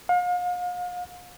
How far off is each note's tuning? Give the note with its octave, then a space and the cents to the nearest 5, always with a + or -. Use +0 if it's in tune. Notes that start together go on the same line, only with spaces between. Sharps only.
F5 +40